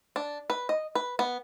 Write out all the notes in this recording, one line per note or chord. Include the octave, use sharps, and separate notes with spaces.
D4
B4
D#5
B4
B3